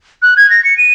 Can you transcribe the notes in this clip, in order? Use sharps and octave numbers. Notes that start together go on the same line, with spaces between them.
F#6
G#6
A#6
C#7
D#7